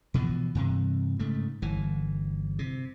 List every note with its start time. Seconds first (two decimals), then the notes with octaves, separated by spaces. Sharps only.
0.14 B2 E3 F3
0.55 G2 C3 E3
1.19 G#2 C#3 A3
1.62 G1 E3
2.59 C3